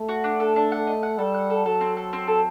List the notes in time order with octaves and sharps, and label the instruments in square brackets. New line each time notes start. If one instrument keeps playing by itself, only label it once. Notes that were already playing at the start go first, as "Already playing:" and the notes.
Already playing: [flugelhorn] A3
[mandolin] F#4
D4
A4
D4
F#5
D#5
F#5
[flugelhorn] G3 [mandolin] A4
[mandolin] F#5
A4
[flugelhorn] F#3 [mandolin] A4
[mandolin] C4
A4
C4
A4